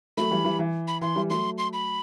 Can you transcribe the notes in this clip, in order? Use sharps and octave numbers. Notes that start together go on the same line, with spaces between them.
F#3 A3 B5
E3 G3
E3 G3
E3
B5
E3 C6
E3 G3
F#3 A3 C6
C6
B5